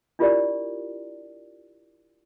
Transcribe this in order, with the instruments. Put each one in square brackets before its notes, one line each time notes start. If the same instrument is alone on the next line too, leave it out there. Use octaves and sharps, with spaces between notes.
[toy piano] D4 E4 F4 G4 A#4 D5